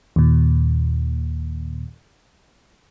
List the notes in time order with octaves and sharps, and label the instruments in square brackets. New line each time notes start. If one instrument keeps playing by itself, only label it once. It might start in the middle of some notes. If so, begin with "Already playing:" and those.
[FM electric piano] D#2 A#2